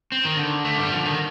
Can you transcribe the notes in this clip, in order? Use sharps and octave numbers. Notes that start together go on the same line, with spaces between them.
C4
D#3
D3
A3
G3
F3
D#3